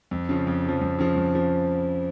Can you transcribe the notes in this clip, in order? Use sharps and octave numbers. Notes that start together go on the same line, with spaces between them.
F2
C#3 F3
F2
C#3 F3
F2
C#3 F3
F2
C#3 F3